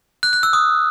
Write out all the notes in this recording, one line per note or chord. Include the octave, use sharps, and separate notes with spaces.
F#6
F#6
E6
D#6